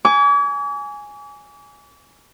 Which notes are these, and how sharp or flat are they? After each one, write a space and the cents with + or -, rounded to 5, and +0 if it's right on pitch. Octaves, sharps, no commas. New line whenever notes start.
G#5 +0 D6 -45